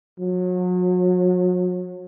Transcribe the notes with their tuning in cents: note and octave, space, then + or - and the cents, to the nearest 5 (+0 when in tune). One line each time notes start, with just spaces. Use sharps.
F#3 -35